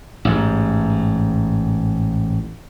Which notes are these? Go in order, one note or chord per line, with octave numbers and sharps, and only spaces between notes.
A1 G#2